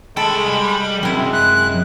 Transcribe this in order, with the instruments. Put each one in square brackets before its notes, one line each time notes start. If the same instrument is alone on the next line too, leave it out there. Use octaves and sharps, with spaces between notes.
[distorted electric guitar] C2 G5 [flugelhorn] G#3 [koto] A4 [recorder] B5
[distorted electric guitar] G3
[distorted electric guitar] F#2 [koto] C3 E4 [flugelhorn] G#3
[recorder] F#6